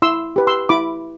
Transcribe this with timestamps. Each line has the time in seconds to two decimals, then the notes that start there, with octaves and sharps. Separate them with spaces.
0.02 E4 C6 E6
0.36 G4 B4
0.47 C6 E6
0.69 E4 B5 D6